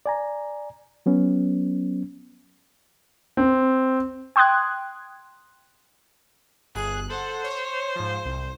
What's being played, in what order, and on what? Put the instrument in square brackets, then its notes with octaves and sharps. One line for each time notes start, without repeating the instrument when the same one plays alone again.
[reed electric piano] D5 G#5 A#5
F#3 B3 C#4
[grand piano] C4
[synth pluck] G5 C6 D#6 F#6 G#6
[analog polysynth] G1 F#6 [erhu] G#4
[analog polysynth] A4 F#5 [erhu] C5
[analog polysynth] C#5
G#2 F3
C2